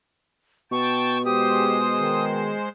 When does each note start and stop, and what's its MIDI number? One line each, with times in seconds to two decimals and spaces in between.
0.72 2.59 47
0.72 1.18 79
0.72 1.18 81
0.72 1.24 85
1.25 2.68 56
1.25 1.83 67
1.25 2.68 72
1.25 2.25 87
1.97 2.56 51